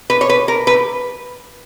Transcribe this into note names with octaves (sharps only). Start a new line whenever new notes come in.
B4
C#5
B4
A#4
B4